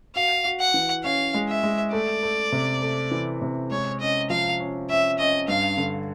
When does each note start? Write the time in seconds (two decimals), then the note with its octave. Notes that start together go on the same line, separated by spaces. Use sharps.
0.15 F#4 F5
0.45 F#4
0.60 F#5
0.74 E3
1.04 C#4 F5
1.34 G#3
1.49 E5
1.63 G#3
1.93 A3 D5
2.23 A3
2.52 C3
2.82 A3
3.11 E3
3.42 C3
3.71 G#3 C#5
4.00 C#4 D#5
4.30 F3 F5
4.60 C#4
4.90 C#4 E5
5.19 C#4 D#5
5.48 G2 F5
5.78 D3